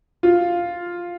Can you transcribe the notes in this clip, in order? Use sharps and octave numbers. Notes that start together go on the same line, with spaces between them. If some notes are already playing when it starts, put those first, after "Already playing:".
F4